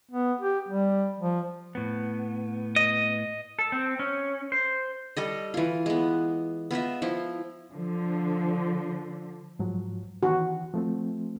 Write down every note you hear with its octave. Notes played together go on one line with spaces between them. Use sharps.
B3
G4
G3
F3
A2 B3
D#5
A4
C4
C#4
C5
G3 A4 D#5
E3 F4
G#3 B3
B3 F4 D#5 E5
F3 E4
D3 F3
G#2 F3 F#3
D#3 E3 F#4
F3 A3 C4